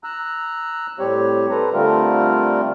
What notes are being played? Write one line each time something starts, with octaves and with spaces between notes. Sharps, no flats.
A#5 E6 F#6
A2 G3 C4 G4 C#5
A4 B4 C5 A#5
D3 G3 A3 C4 F4 A#4